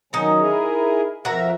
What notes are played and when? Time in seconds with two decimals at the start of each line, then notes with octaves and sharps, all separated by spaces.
0.13 D#3 F#3 C#4 D#4 A#5
0.40 E4 G#4 A#4
1.25 F2 F#4 A#4 E5 A#5